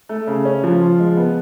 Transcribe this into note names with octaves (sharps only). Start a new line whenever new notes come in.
A3
C#3
C#4
F3
F4
G#3
B3